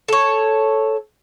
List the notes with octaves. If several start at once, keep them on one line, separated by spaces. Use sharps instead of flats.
A4 C#5